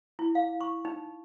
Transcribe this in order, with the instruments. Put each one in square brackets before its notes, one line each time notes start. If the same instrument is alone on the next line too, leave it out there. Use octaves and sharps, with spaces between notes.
[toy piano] E4
F5
C#6
D#4